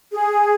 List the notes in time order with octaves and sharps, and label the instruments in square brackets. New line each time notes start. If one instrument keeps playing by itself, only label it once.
[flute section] G#4